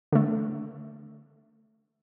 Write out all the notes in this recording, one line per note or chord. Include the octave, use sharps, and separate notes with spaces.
D3 A3